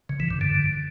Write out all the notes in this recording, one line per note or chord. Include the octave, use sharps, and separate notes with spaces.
C#3
E3
G2
D3